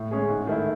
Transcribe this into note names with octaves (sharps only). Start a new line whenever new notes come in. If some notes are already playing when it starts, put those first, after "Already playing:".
Already playing: A2
G#3 C#4 G#4
G#2
D#3 A3 E4